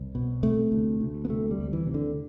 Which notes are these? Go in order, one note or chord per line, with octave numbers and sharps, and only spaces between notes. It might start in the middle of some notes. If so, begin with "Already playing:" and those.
Already playing: C2
B2
C3 A3
D2
D2
B3
C3 A3
G3
D2
E3
C3
D3